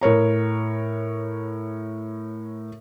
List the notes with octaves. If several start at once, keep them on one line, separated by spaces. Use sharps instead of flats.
A2 A#4 C#5 A#5